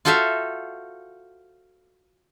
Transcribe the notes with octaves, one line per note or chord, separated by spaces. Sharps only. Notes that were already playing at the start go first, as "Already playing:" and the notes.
F4 F#4 A4 C5 E5 F5